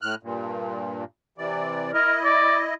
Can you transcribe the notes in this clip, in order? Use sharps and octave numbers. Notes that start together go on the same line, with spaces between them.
A2 F6 F#6
G2 A#2
C3 E3 D5
E4 A#4 D#5
D5